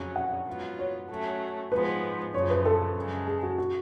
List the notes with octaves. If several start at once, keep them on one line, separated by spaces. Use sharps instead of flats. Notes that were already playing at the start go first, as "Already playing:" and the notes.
Already playing: F2 C#3 F#3 C#4
F#5
G#2 F#3 B3 F4
C#5
F#3 A3 C#4
G#2 F3 G#3 B3 B4
F#2 C#3 F3 C#5
B4
A4
F#2 C#3 G#3
G#4
F#4
F#4